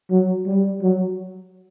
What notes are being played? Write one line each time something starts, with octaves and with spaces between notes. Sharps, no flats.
F#3
G3
F#3